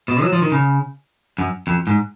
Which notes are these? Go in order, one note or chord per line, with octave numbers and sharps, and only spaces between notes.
B2
F#3
F3
D#3
C#3
F#2
F2
G#2